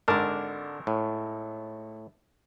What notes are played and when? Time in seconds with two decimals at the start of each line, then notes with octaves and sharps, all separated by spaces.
0.08 G#1 D3 D4 A#4 A5
0.87 A2